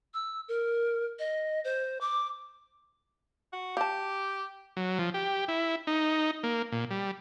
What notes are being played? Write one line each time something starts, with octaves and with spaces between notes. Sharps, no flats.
E6
A#4
D#5
C5
D6
F#4
G4 F5 A5
F#3
F3
G4
E4
D#4
A#3
A#2
G3